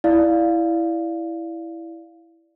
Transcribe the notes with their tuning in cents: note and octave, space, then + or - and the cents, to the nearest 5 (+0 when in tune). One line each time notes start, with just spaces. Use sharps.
E4 +0 D5 +0 F5 +0